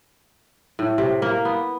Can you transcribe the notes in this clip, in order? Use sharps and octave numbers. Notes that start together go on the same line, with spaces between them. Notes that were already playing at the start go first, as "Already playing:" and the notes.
A2
C3
A#3
B3